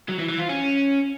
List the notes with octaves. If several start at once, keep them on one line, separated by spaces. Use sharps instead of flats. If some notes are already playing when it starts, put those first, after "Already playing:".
F#3
E3
E3
F4
C#4